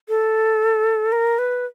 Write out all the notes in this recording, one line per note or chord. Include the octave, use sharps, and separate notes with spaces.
A4
A#4
B4